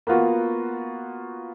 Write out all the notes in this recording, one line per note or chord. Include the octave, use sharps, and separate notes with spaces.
A#3 B3 F4 F#4